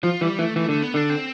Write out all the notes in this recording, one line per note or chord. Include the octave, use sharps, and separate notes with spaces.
F3 F4
E3 G3
E3 A3
E3 A3
D3 A3
B3
D3 D4
C4